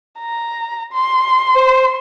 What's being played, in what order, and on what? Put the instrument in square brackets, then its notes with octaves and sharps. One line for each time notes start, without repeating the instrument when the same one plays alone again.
[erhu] A#5
C6
[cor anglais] C5